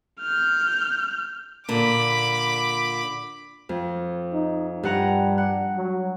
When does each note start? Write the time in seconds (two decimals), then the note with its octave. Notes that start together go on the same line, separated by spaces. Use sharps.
0.21 F6 G6
1.69 A#2 D3 B5 D6
3.69 F2
4.33 D#4
4.83 G2 G3 F#5 A#5
5.38 F#5
5.77 F#3